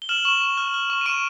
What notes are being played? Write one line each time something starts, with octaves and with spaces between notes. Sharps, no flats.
G7
F6 E7 F#7
C#6 E7 F#7
C#6
F6
F6
C#6
D#7
C#6 D7 E7